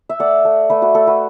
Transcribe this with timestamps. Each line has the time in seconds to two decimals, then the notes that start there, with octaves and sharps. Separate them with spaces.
0.09 E5
0.20 A3 D5 F#5
0.45 A3
0.70 A3 B4 E5
0.82 F#4 B4
0.94 A3 A4
1.07 F#4 B4